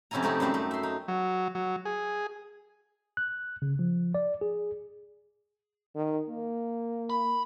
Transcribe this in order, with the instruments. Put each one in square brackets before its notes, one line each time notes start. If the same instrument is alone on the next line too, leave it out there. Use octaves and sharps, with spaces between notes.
[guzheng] F2 C3 C#4 E4 G#5 A#5
A3 C4 D#4 G4
F#2 G3 A3 C4
A3
E5 C6
D#4
[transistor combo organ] F#3
F#3
G#4
[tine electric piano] F#6
C#3
F3
D5
G#4
[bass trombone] D#3
A#3
[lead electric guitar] B5